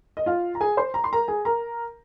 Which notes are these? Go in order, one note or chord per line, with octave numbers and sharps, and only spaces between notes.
D#5
F4 F5
A#5
G#4 G#5
C5 C6
A#5
C6
A#4 A#5
G#4 G#5
A#4 A#5